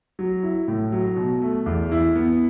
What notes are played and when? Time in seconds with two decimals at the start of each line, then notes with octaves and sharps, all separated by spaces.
0.19 F#3
0.43 E4
0.68 A2
0.92 F#3
1.16 B2
1.42 A3
1.66 E2
1.92 E4
2.15 B3